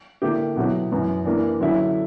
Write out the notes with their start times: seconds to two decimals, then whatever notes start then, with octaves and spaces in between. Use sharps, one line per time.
0.22 D3 A#3 E4 G4
0.56 B2 F#3 B3 E4 G4
0.92 F#2 E3 B3
1.25 E3 A#3 D4
1.60 D3 F#3 C#4 E4